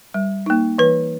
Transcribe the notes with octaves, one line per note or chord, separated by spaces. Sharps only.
G3
A#3 D#4
E3 B4